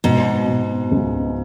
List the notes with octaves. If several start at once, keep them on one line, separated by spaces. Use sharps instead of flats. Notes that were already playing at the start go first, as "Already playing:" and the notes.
G#2 B2
B2
C#2